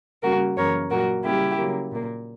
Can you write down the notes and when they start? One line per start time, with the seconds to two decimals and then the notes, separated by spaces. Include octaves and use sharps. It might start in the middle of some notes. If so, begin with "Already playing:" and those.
0.23 C#3 G3 A#3 F#4 A#4
0.57 F#2 C#3 E3 A#3 A#4 C#5
0.91 A#2 F#3 A#3 F#4 A#4
1.24 C#3 G3 A#3 E4 G4
1.58 C#3 F#3 A#3
1.92 A#2 A#3